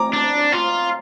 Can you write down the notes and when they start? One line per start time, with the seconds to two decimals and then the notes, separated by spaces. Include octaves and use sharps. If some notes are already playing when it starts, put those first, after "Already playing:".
Already playing: A#5 D6
0.13 D4
0.52 F4